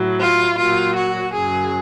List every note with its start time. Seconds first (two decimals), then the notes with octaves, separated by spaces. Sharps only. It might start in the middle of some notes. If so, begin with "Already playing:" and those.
Already playing: A2 F#3
0.18 F4
0.57 A#2 F#3 F4
0.95 F#4
1.33 F#2 C#3 F#3 G#4